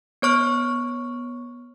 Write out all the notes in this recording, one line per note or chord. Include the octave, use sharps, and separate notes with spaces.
B3 C#5 C#6 F6